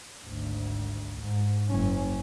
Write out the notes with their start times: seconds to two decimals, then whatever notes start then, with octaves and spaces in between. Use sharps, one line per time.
0.25 G#1 D2
1.18 G#2
1.68 F#1 C#4